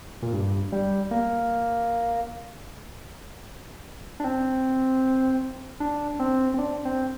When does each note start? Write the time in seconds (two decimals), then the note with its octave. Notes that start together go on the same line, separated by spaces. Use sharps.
0.22 A#2
0.33 G2
0.72 G3
1.11 A#3
4.20 D4
4.24 C4
5.80 D4
6.19 C4
6.54 C4
6.58 D4
6.85 C4